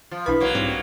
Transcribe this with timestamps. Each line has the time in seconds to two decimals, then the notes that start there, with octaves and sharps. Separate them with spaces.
0.11 F3 F4
0.26 B1 E3 D4 E4 B4 B5
0.40 F#3 A#3
0.55 G#2 G3 C4